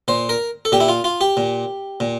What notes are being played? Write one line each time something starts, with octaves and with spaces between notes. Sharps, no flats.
A#2 C5
A#4
A4
A#2 G4
E4
F4
F4
G4
A#2
A#2